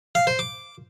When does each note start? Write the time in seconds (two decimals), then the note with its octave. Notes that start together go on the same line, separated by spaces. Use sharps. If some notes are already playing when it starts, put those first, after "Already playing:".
0.15 F5
0.27 C5
0.39 D6